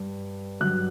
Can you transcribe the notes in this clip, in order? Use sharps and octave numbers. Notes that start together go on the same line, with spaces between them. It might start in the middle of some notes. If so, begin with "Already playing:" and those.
Already playing: G2
G2 D3 F#3 F#6